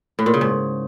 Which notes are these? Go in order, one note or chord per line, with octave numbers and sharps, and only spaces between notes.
A2
A#2
C#3
G#2